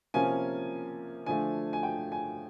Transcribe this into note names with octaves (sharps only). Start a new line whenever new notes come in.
C3 F3 A#3 C#4 G#5
D3 F3 A3 D4 G#5
G#5
G5
G#5